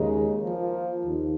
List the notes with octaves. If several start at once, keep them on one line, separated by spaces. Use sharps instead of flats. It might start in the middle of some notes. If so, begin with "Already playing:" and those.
Already playing: D#2 C#3 G#3 D#4 G#4
F3 A#3 F4
D#2